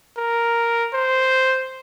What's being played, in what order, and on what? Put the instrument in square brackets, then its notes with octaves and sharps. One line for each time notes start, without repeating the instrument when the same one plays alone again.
[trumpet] A#4
C5